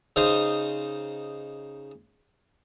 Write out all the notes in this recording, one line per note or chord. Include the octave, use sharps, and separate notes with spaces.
C#3 D#4 C5 D#6